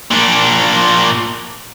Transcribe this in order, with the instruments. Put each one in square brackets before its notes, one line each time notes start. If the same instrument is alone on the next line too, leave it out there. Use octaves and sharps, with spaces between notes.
[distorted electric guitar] A#2 D4